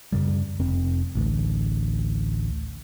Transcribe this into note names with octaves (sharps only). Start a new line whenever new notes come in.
F#2 C#3 G3
F1 C4
A1 D2